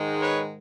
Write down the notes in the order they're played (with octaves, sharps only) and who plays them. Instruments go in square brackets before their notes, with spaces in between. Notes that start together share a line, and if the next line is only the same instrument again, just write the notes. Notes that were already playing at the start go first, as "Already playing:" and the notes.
Already playing: [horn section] G#2 D#3 G#3
B4 C#5